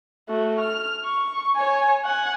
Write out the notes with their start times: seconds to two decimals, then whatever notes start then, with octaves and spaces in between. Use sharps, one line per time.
0.29 A3 F#4
0.60 F6
1.05 C#6
1.55 C#5 G#5
2.05 F#5 G#5